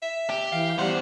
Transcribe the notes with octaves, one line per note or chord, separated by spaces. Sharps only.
E5
G4
E3 F5
E2 G3 C5 F#5